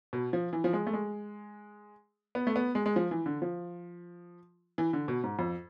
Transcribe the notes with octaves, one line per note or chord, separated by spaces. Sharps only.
B2
F3
E3
F3
G#3
A3
G#3
B3
A3
B3
G#3
G#3
F3
E3
D3
F3
E3
D3
B2
G#2
F2